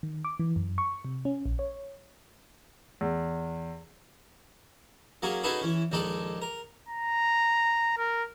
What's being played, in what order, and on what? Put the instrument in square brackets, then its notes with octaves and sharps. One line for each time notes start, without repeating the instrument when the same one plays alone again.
[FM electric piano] D#3
D6
E3
F#2
C#6
C3
C#4
A#1
C#5
[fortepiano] E2
[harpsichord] F#3 A#3 C#4 G#4
C#4 D#4 F#4 G#4 A4 B4
E3 C#4
A#1 D#2 G#3 D#4 A4 D5
A#4
[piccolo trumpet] A#5
A#4